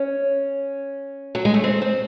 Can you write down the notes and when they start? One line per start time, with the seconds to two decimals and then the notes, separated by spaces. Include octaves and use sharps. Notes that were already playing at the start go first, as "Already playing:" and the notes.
Already playing: C#4
1.35 F#3
1.45 G#3
1.54 A3
1.64 C4
1.82 C4